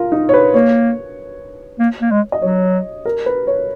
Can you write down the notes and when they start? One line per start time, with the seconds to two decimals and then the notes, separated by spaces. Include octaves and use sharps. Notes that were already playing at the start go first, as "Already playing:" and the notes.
Already playing: F4 A#4
0.12 D#4
0.29 C#5
0.34 B4
0.54 A#3 C#5
1.79 A#3
2.01 A#3
2.11 G#3
2.32 D#5
2.42 F#3 C#5
3.05 A#4
3.26 B4
3.47 C#5